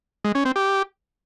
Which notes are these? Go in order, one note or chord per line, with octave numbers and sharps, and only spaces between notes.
G#3
C#4
C4
G4